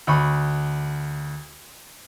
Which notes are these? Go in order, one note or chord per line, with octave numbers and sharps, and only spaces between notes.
D2 B5 C#6